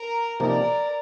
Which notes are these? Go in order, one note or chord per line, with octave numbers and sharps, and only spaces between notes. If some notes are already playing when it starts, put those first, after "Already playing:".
Already playing: A#4
C3 F3 A#3 D#4 A#4 D5